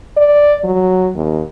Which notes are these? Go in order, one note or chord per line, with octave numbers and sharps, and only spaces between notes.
D5
F#3
D#2